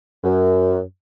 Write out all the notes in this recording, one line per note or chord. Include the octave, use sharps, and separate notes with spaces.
F#2